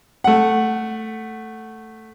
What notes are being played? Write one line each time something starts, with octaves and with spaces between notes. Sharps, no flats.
A3 F#5